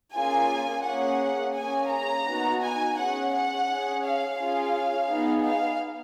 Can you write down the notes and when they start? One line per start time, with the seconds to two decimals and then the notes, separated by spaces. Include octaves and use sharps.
0.15 A#3 C#4 F4 G#4 G#5
0.85 A#3 C#4 G#4 F#5
1.56 A#3 C#4 G#4 G#5
1.91 A#5
2.27 B3 D#4 F#4
2.63 G#5
2.97 C#4 G#4 F#5
3.33 F#5
3.68 C#4 G#4
4.04 F5
4.39 C#4 F4 G#4 F5
5.10 B3 D#4 G#4
5.46 F5